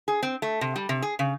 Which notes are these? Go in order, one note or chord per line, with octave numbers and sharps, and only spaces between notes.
G#4
C4
A3
C3
G3
C3
G#4
C#3